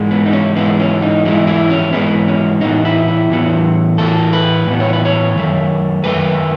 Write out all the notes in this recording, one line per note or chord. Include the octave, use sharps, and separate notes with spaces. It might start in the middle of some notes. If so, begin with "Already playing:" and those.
Already playing: G#2 E3 G#3
B3
D#4
C#4
G#2 E3 G#3 B3
C#4
D#4
G#2 E3 G#3 E4
E4
C#4
G#2 E3 G#3 B3
C#4
A2 E3 B3 D#4
E4
E4
A2 E3 B3
A2 E3 B3 A4
B4
A2 E3 B3
C#5
B4
C#5
F#2 D#3 A3
F#2 D#3 A3 B4